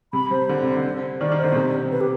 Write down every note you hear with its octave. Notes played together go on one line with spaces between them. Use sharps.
C3 B5
C3 C5
D3
C3
D3
D#3 D5
D#3
C5
D3
B2
C3
B4
G4